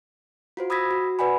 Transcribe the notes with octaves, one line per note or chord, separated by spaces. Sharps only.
F4 F#4 C5
B5 D#6 E6 G#6 A#6 B6
F#4
B4 D5 F#5 G#5 B5